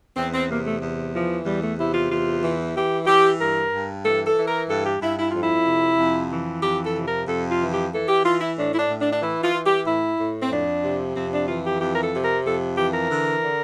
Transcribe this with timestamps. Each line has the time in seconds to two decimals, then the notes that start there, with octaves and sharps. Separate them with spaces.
0.16 E2 C4
0.33 C4
0.49 C3 A#3
0.66 A3
0.81 E2
1.14 E3 F3
1.45 E2 G3
1.61 A3
1.78 C3 E4
1.94 F4
2.10 E2 F4
2.43 E3
2.75 E3 G4
3.07 E3 G4
3.39 G2 A#4
3.73 G2
4.05 E3 A4
4.26 A4
4.37 E3
4.48 A#4
4.69 G2 A4
4.86 G4
5.01 G2 E4
5.18 E4
5.29 F2 F4
5.40 E4
5.66 C3
5.98 F2
6.30 E3
6.62 F2 G4
6.84 A4
6.96 C3
7.07 A#4
7.27 F2 A4
7.50 F4
7.60 E3
7.71 G4
7.92 E3 A4
8.08 G4
8.24 E3 F4
8.40 E4
8.57 A2 D4
8.74 E4
8.78 D4
8.89 A2
9.00 D4
9.11 D4
9.22 E3 E4
9.43 F4
9.54 E3
9.65 G4
9.86 A2 E4
10.18 A2
10.42 C4
10.51 F2 D4
10.84 C3
11.15 F2 C4
11.32 D4
11.47 E3 F4
11.64 G4
11.80 F2 G4
11.93 A#4
12.02 A4
12.13 C3
12.23 A#4
12.44 F2 A4
12.77 E3 G4
12.93 A#4
13.10 D3
13.42 D3